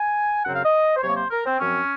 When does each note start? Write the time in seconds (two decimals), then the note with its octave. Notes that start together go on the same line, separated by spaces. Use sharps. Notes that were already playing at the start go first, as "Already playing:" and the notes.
Already playing: G#5
0.44 F#2 C#3 F#3 C4 F#5
0.55 F5
0.64 D#5
0.96 C5
1.02 C3 F#3 A#3 C#5
1.17 C5
1.31 A#4
1.45 C4
1.60 F#2 F3 C4 C#4